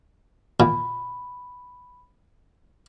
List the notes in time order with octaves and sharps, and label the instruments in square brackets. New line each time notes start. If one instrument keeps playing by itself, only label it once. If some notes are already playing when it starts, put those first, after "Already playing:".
[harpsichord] A#2 [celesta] B5